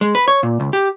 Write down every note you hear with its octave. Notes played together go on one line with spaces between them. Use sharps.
G#3
B4
C#5
A#2
C#2
G4